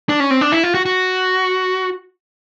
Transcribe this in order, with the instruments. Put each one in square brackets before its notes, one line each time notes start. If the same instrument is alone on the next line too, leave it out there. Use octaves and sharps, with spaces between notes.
[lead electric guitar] D4
C#4
C4
D4
E4
F4
F#4
F#4